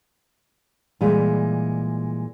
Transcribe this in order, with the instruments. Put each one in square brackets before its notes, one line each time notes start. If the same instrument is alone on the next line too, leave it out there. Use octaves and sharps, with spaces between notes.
[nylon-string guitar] A#2 E3 G3 G#3